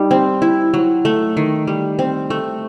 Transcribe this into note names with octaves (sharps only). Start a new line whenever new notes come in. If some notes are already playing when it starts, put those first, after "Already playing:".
Already playing: G3 D#4
C4
E4
F#3
A3
D#3
G3
C4
A3